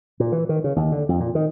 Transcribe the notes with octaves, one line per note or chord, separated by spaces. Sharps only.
A#2
E3
D#3
C#3
D#2
D3
F2
A#2
D#3